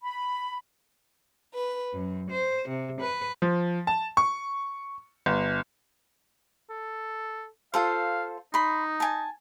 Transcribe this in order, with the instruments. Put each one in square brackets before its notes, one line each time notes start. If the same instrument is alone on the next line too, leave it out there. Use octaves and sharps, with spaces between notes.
[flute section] B5
[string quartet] B4
F#2
C5
C3
B4
[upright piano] F3
A5
C#6
G1
[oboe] A4
[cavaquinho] F4 A4 C5 [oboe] F5
[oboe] D#4 [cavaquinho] B5 C6
[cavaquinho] G#5 A5